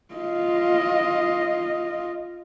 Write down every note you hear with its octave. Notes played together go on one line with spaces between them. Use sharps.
F4 D#5